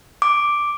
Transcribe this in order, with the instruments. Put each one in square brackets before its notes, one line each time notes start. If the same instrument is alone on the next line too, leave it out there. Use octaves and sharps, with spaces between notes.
[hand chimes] D6